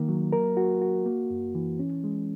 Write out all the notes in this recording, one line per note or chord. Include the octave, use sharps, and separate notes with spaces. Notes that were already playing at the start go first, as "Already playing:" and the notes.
Already playing: D#3 A#3
F#3
A#4
F#4
F#4
A#3
F#2
E3
C#4
G#3